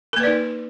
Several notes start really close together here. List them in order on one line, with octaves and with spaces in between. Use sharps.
A#4 A#3 B4 D5 D#4